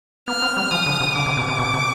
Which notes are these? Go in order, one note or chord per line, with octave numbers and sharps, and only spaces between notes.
B3 F6
C4
G3
F3 D#6
D3
C3
D3 D6
C3
B2
C3
B2
C3